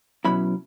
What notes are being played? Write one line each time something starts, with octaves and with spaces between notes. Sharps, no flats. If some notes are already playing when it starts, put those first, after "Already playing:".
B2 F#3 C#4 E4 B5